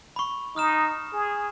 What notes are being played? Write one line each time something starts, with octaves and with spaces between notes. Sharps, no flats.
B5 C#6
D#4 D#6 F6 E7
G#4